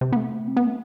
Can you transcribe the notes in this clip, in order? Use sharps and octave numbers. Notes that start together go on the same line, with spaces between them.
C3
B3
A3
C4
B3
A3